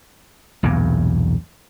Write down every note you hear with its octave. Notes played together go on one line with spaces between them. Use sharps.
B1 E2 G2 A#2